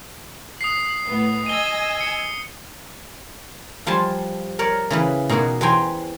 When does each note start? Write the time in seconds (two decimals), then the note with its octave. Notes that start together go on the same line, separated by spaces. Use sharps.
0.61 D#6 F#6 C7
1.05 A2 B3
1.46 D#5 G#5 E6 D#7 G7
2.01 C#7
3.86 F3 G3 G#5 A5 C6
4.59 A#4 C#5 D5
4.90 C#3 E3 B4
5.29 B2 A#3 D#4 F#4 G#4
5.61 E2 B4 C5 G5 G#5 A#5